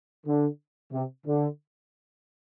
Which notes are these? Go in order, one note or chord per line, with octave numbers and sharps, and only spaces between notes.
D3
C3
D3